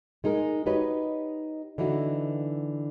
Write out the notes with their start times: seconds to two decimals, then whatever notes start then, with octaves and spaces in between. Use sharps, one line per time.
0.24 G#3 D#4 G#4 A#4
0.66 D#4 F#4 G4 B4 C#5 D#5
1.78 D3 E3 D#4 E4 F#4